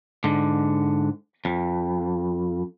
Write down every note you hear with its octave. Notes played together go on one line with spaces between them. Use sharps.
G#2 D3
F2